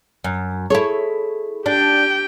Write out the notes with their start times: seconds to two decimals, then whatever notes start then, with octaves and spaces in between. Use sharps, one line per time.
0.24 F#2
0.70 E4 G#4 A4 C#5
1.66 D4 G4 G5